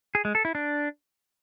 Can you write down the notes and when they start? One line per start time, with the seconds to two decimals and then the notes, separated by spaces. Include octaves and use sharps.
0.15 G#4
0.25 G#3
0.35 A4
0.45 E4
0.55 D4